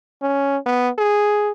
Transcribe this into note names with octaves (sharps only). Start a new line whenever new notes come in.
C#4
B3
G#4